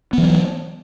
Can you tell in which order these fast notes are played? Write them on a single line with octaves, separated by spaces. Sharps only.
B3 E3 F#3